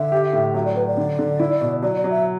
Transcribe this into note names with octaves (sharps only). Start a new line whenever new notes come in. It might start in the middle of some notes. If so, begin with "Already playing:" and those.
Already playing: D3 E5
G4
A2
F#3 E5
D5
F#3 B4
D5
D3
D3
E4
B2
F#3 D5
D5
F#3
E5